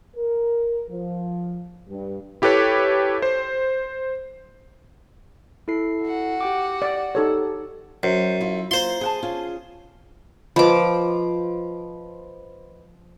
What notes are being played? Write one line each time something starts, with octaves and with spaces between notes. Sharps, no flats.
A#4
F3
G2
E4 G4 A4 B4 C#5
C5
E4 A4 C7
F#4 F#5
G4 G5 D6
D5
D#4 G4 A4 C#5
F#2 C5
E4 F4
A#3 F4 C5 C6
G#4 F#5 A5
C#4 F4 G#4
F3 B4 D#5 B5 D6